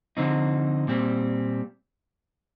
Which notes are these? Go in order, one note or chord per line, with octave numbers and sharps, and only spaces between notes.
D3 F3 C4 D#4
A#2 G3 C4